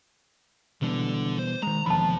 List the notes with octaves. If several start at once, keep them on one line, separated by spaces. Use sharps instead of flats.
B2 D3 E3 G3 D4
C5
D#3 G#3 A#5
E1 D#2 D3 F3 A5 B5